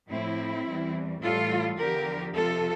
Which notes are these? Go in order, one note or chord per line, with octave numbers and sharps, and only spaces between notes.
A2 F3 C4 E4
E2 E3 G3
A2 E3 G3 F4 A4
E2 D3 F3 G4 A#4
F2 C3 F3 F4 A4